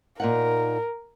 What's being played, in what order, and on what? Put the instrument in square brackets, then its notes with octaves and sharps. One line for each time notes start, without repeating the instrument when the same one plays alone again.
[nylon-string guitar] A#2 D#4 F#5 [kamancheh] A#4